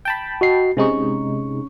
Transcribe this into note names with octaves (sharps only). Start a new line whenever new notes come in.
G5 A5 B5
F#4 D#5 C7
C3 G#3 C#4 D#4 C#6